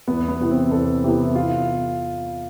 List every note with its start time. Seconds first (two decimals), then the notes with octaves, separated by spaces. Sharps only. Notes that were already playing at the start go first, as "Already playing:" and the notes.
0.08 E2 B3
0.28 B3
0.40 C3 E3 B3
0.51 C4
0.71 E2 A4
1.04 C3 E3 B3 G4
1.35 F4